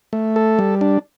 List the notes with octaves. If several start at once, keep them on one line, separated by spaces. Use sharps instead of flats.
A3
A4
G3
D4